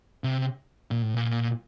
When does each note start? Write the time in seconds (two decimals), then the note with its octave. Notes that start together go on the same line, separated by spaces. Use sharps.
0.24 C3
0.91 A#2
1.02 A2
1.14 A#2